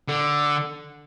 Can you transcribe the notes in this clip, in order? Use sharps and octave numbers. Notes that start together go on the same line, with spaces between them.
D3